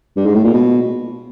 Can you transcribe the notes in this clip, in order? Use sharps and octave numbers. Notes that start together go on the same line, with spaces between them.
G2
G#2
A2
A#2
B2